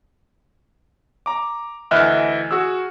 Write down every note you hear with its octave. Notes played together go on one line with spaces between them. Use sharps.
A#5 D6
D2 E3 D#5 E5 F6 F#6
F#4 G#4 E6